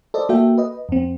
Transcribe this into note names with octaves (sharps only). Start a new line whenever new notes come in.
A4 C5 D5 D#5
A#3 F#4 A4 E5 G5
B4 D#5
F2 C4